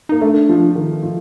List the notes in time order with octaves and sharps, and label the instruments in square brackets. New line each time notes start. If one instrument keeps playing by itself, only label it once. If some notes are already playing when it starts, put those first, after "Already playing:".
[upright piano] A#3 [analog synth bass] D#4
[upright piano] A3 [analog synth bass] D4
[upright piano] F3
D#3
F3